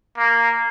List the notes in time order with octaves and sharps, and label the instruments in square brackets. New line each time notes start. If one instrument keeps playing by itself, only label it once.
[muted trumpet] A#3